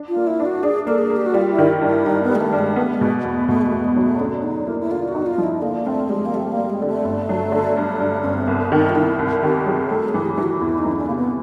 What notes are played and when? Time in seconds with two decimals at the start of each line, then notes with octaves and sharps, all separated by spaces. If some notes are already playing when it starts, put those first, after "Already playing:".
Already playing: D4
0.09 F4
0.16 A#3
0.27 E4
0.40 D4
0.45 F#4
0.63 D4 G#4
0.87 A#3 A4
0.98 G#4
1.10 A#3
1.16 G4
1.26 F#4
1.34 G3 F4
1.52 E4
1.58 D#3
1.81 G2
1.87 E4
2.06 G2 D#4
2.23 B3
2.30 G3
2.35 G#3
2.41 A3
2.53 G2
2.59 G#3
2.76 A3 B3
2.94 G#3
3.01 B2
3.25 E2
3.30 A3
3.48 B2 A3
3.61 G#3
3.66 A3
3.71 E2
3.84 G#3
3.96 F#3
4.02 A3
4.20 D3 C#4
4.43 D3 D#4
4.67 A#3 E4
4.80 E4
4.91 D3 F4
5.09 F#4
5.15 D#4
5.26 F4
5.38 F3
5.44 E4
5.61 D3 A#3
5.86 A3 C4
6.09 G3 G#3
6.26 A#3
6.34 G3 A3
6.52 A#3
6.57 G3
6.70 G#3
6.82 D3
6.87 A3
7.04 G1
7.29 F#3
7.52 D3
7.77 G2
8.00 G2
8.21 G1 C#4
8.34 C4
8.47 C2 B3
8.72 D#3 D#4
8.89 F4
8.95 D#3 E4
9.19 C2
9.43 D#3 G4
9.66 F#3 G#4
9.90 A3 A4
10.08 G#4
10.14 E3
10.25 G4
10.35 E3 G4
10.43 F#4
10.61 E2 E4
10.79 D#4
10.85 E3
10.92 C#4
10.97 D4
11.07 C3 A#3
11.15 B3